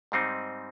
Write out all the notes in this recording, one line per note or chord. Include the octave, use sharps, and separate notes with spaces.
G#2 G3 C4 D#4